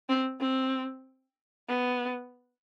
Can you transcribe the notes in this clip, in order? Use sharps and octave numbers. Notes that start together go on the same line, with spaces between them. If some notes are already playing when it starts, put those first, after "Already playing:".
C4
C4
B3